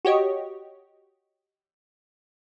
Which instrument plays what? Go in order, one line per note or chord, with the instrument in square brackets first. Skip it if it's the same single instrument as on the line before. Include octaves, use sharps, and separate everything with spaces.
[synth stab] F#4 G4 C#5 D#5